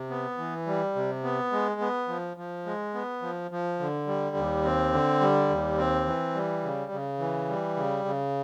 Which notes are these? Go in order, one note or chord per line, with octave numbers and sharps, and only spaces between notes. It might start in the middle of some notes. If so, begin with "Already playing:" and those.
Already playing: C3
B3
E3
G3
C3
B3
G#3
B3
F3
F3
G#3
B3
F3
F3
D3
G3
D#2
C4
D3
G3
D#2
C4
E3
G3
C#3
C#3
E3
G3
C#3
C#3